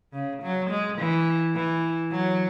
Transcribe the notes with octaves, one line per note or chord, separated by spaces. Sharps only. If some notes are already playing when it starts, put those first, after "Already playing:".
C#3
F#3
G#3
E3
E3
F#3